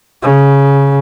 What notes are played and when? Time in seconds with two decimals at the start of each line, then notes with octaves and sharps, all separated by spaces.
0.23 C#3